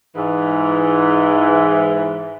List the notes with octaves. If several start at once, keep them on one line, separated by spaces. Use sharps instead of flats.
G#2 E3